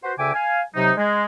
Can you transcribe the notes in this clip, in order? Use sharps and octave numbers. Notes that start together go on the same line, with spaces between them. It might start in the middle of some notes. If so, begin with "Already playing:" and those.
F#4 B4 C5
D2 C#3 E5 G5 G#5 D6
F5 G#5
C3 F#3 D#4
G#3